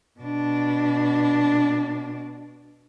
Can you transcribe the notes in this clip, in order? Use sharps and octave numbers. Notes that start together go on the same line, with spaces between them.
B2 D4